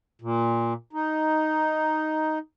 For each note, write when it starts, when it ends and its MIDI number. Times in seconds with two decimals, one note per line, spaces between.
0.22 0.73 46
0.93 2.39 63